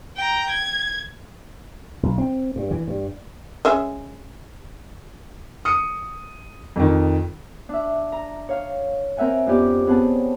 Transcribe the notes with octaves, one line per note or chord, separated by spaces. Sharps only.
G5 A#5
G#6
B1
C4
G2
E3
G2
G#3 C#4 E5
D#6 C#7
F2 D#3
D4 E5
A#5
C#5 F5
C4 A#4 E5 F#5 G#5
F2 B3 C#4 G4 D5
B3 C4 G#4 C#5 F#5 A5